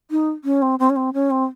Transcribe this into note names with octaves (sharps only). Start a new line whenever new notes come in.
D#4
C#4
C4
C4
C#4
C4
C#4
C4